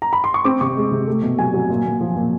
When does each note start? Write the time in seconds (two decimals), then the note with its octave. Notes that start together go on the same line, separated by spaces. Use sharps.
0.02 A#5
0.13 B5
0.24 C6
0.34 C#6
0.44 C4 D6
0.61 C3 C#6
0.77 G#3
0.92 C3
1.07 A3
1.23 B2
1.38 F#3 G#5
1.54 F#3
1.70 A#2
1.85 A#2
2.01 F3
2.16 A#2